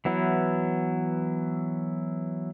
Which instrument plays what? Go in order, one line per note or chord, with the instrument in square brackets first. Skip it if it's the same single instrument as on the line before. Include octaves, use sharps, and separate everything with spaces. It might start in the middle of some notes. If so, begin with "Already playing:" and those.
[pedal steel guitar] E3 F#3 B3 E4